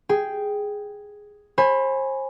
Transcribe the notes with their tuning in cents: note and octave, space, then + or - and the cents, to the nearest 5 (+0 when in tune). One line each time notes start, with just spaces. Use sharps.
G#4 +0 G5 +0
C5 +35 G#5 +0 B5 +5